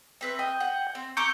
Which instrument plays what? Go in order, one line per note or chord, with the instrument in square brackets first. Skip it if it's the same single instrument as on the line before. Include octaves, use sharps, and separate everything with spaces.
[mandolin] C4 B4 E5
[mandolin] D#5 [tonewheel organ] G5
[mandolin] F#5
C4
[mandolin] A#5 D6 E6 [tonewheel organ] C#6 G6